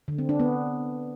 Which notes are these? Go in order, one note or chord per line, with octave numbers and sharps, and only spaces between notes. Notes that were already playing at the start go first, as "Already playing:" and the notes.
D3
C4
D4
B3